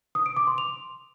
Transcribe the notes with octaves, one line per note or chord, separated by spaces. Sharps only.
D#6
D7
D6
C6
F7